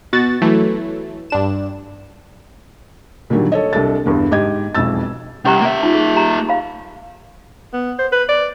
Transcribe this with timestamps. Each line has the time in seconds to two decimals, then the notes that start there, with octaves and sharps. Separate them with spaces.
0.13 B2 F#4 A6
0.42 E3 F#3 A3
1.30 G2 D4 E7
3.30 A#2 D3 D#3 F#3 G3
3.52 A4 C#5 D#5
3.73 C2 D4 A4 A6
4.06 E2 G2 D3
4.31 G#2 G4 D#5 G#6
4.75 E1 B1 F2 E6 A6
5.45 C2 C#4 G4 A#5
5.62 A#3 E5
5.83 D#4 F4
5.94 G#4
6.15 G4 A#5
6.49 F5 B5
7.73 B3
7.98 C5
8.12 B4
8.29 D5